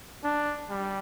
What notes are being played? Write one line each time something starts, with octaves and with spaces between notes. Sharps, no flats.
D4
G3